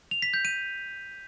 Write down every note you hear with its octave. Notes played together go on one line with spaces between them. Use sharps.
F7
B6
G6
D#7